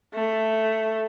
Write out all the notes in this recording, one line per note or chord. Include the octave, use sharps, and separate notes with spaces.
A3